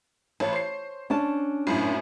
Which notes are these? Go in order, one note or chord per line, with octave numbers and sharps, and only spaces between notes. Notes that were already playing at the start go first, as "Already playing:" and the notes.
A1 C#5 A5
C5 C7
C#4 D4 A5
G#1 F#2 A2